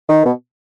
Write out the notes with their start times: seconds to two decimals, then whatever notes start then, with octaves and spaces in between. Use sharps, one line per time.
0.09 D#3
0.25 B2